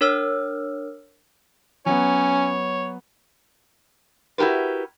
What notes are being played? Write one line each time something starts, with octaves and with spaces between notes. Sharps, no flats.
D4 A#4 C#5 E6 F6
F#3 B3 C#4 C#5
E4 F#4 G4 A#4 B4